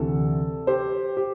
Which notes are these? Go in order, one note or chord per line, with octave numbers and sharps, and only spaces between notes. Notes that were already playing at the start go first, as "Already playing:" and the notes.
Already playing: D2 C3 E3 A4
G4 C5
G4